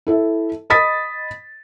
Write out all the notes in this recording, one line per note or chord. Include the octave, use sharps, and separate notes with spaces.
E4 A4 E5
D#5 B5 D#6 A6 B6